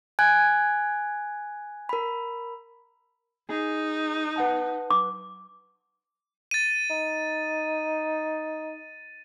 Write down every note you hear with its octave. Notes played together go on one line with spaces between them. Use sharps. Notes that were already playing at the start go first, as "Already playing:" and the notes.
G#5 F#6 G#6
A#4 B5
D#4 G#4
B4 F#5 A5
D6
A6 D#7
D#4